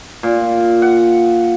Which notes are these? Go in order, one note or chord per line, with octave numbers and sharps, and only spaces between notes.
A#2
F#5